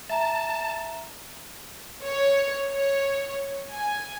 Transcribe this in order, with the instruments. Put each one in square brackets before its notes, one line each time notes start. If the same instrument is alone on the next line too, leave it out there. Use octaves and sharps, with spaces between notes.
[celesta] E5 A#5 [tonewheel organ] A5
[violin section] C#5
C#5
G#5